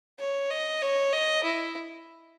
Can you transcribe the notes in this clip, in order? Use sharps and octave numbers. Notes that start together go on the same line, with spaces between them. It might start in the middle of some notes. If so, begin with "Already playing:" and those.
C#5
D#5
C#5
D#5
E4